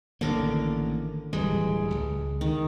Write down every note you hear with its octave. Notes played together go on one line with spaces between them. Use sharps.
A1 D3 D#3 A#3 A#4 D6
D1 E3 G3 G#3
C#2
D#3